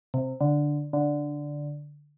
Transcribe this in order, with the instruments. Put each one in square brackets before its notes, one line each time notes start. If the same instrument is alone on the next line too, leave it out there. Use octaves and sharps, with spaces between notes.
[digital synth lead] C3
D3
D3